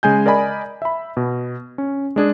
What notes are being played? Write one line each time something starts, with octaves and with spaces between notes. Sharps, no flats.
C#3 G#3 G#5 G6
A#4 D5 D#5 G#5 B5
E5 B5
B2
C#4
G#3 D4 G#4